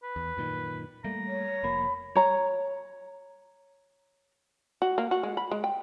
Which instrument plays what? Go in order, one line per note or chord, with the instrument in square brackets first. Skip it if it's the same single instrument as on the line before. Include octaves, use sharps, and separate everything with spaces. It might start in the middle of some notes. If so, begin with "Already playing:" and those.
[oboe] B4
[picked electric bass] E2
F#2 A#2 D#3
[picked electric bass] G3 A3 A#3 [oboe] A#5
[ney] C#5
[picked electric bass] F1 F3 A#3 [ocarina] B5
[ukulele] C#5 A#5
[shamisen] F#4
A#3
F#4
G#3
B5
G#3
G5